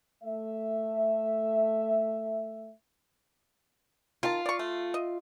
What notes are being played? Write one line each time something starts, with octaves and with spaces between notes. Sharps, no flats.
A3 E5
D#3 F4 A5
D5 C#6
A3
D#5